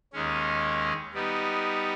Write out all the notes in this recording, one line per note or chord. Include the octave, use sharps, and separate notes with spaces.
D#2 D#3 G#3 C#4
G3 B3 D#4